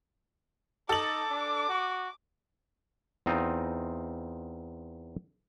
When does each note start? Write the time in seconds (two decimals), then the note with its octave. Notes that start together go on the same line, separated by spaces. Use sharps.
0.89 D#4 A4 D6 F#7
1.30 D4
1.69 F#4
3.26 E2 C4 D#4 F4 D#5